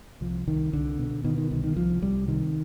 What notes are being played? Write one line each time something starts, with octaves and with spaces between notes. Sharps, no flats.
C2 F3
C2 D#3
C2 D3
B2
B2 D#3
D#3
C2 D#3
D#3
C2 F3
C2 G3
C3 D#3